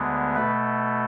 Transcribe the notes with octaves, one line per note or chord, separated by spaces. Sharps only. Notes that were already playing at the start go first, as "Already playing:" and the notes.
Already playing: D2 D3 G#3 B3
B2 A3 B4